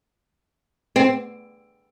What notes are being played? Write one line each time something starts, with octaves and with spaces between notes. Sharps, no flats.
C4